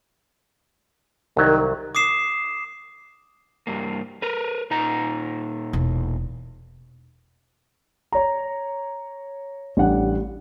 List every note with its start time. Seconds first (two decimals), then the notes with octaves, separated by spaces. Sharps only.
1.37 C2 D#3 F#3
1.95 D6 D#6 C7 E7
3.67 G2 A#3
4.22 A#4 B4
4.71 A#2 D#4 A#5
5.73 E1
8.12 C#5 A#5
9.77 A1 G3 D4 F#5